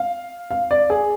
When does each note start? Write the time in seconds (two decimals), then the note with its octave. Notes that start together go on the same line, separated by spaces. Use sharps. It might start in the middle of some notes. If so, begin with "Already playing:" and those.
Already playing: F5
0.51 F5
0.71 D5
0.90 G#4